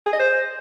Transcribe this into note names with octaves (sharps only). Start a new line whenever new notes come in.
G#4
D#5
C5